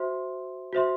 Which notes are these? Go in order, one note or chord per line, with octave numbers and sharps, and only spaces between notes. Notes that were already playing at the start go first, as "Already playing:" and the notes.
Already playing: F#4 C5 E5 C6
F#4 C5 E5 C6